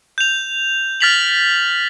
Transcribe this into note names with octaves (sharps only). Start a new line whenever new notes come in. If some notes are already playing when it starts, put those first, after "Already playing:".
G6 F7
F6 A6 B6 F7 F#7